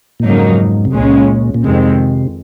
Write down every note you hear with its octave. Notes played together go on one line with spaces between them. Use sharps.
A#2
F2 G#2 C#3 F#3 A#3 D#4
C3
C#2 A#2 C#3 G#3 C#4
A#2
F2 C3 D#3 G#3 C4